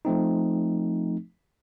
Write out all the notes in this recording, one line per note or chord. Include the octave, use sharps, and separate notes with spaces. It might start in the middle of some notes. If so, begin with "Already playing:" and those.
F3 A3 C4 D#4